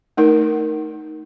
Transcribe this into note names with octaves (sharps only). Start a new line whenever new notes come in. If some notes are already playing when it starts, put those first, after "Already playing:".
A3 D#4 A#4